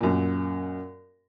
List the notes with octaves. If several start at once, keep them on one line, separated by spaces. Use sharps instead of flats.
F#2 A#2